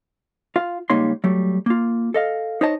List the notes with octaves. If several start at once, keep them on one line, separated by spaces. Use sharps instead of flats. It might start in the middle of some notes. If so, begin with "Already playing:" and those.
F4 F5
C#2 G3 A#3 D#4 C#5 C6
F#3 G3 A3
A#3 F4
A4 D#5 F5
D#4 C5 C#5 D#5 A5